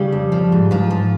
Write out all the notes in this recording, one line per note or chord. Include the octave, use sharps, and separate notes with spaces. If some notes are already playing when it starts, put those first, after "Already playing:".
Already playing: C#3 G3 G4
F2
F3
G#2
G#2 F3 F4
F3